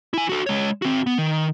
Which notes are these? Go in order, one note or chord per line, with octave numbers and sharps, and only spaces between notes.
E4 G#5
F#4 A4
G#3 C#5
C4 F#4
B3
D#3